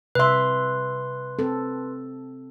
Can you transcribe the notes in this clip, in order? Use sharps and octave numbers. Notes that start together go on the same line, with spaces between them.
C3 B4 E5 C6
C4 A4